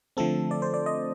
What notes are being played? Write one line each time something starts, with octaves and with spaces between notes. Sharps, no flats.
D3 F3 A3 C4 A4
D5
C5
D5
D#5